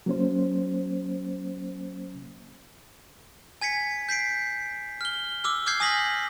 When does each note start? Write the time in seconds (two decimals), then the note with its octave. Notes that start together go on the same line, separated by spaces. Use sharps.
0.06 F#3 A#3 C#4 C5
3.61 G#5 G#6 B6 C#7
4.09 G6 B6 C7 D7
5.01 F6 G7
5.44 D6 E6 F6
5.66 D6 F6 G6 G#6 C7
5.80 G#5 D#6 F6 A#6 B6 F#7